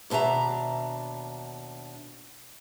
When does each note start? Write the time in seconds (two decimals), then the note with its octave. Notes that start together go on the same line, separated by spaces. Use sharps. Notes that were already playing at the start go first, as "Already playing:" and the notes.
0.10 D#2 B2 D4 E5 A#5